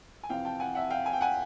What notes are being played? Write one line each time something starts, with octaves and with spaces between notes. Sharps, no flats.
G#5
F2 C3 E3 F5 G5
G5 A5
F#5 G#5
E5 F#5
F5 G5
G#5
G5
F#5 G#5